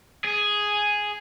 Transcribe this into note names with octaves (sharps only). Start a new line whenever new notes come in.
G#4